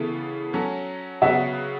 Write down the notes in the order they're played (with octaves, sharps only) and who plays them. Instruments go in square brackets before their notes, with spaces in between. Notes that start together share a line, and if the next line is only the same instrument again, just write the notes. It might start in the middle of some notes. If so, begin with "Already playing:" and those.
Already playing: [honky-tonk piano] C#3 E3 B3 E4 A4
F#3 C#4 A4
[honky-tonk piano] C#3 F#3 B3 F#4 [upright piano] E5